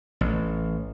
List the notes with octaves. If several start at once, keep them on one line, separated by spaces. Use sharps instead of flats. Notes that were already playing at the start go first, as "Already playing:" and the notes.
A1